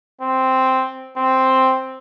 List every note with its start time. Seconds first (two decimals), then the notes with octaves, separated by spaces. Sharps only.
0.21 C4
1.17 C4